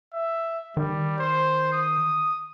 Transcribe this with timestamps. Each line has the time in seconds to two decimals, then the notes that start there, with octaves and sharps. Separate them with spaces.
0.13 E5
0.77 D#3 G3
1.19 C5
1.73 D#6